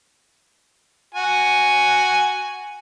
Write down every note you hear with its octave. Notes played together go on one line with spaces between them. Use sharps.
F#4 G#5